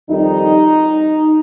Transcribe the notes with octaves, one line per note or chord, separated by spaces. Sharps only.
F2 D#3 G3 D#4